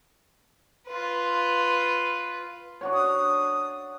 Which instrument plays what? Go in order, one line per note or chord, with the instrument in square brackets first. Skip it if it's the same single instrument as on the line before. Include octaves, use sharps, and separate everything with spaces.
[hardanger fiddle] F4 B4
[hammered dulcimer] D4 F#4 C#5
[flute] D#6